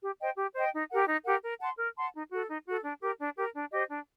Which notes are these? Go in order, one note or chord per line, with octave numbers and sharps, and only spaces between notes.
G4
C5 D#5 G5
G4
C5 D#5 G5
D#4
G4 A#4 F#5
D#4
G4 A#4 F#5
A#4
F#5 A5 C6
A#4
F#5 A5 C6
D#4
F#4 A4
D#4
F#4 A4
D4
G4 A#4
D4
G4 A#4
D4
G4 C5 D#5
D4